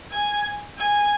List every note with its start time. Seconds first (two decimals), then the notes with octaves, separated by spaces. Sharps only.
0.12 G#5
0.79 G#5